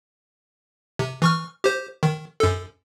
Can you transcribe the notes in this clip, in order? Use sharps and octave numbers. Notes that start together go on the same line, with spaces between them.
C3
E3 C#6 F6
G4 C5
D#3
F#2 A4